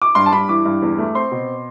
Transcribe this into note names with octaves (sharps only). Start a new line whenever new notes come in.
D6
G2 C6
A5
G2 B5
E3 D6
G2
E2
A3
C4 C6
B2